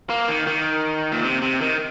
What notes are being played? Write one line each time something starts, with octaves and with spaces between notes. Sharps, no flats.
A#3
D#3
D#3
A#2
C3
C3
D#3